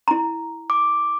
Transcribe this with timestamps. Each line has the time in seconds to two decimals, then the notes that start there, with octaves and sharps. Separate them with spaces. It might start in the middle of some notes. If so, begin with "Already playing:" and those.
0.08 E4 A#5
0.70 D6